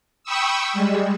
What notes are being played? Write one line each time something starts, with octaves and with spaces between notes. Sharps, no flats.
G5 B5 C#6 D#6 E6
G3 G#3